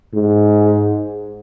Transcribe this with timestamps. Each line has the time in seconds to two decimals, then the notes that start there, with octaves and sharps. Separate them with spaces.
0.14 G#2